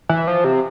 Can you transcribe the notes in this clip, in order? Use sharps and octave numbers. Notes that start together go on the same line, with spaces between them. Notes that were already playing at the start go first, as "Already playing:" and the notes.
E3
F3
C3